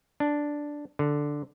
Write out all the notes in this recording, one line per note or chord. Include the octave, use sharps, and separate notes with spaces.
D4
D3